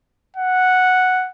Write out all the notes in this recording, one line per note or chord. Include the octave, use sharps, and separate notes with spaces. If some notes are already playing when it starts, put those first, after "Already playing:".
F#5